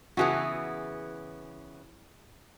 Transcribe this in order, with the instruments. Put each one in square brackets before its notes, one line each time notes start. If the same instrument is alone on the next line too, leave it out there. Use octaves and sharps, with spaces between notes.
[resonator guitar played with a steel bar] C#3 E3 B3 [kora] F#4 G#4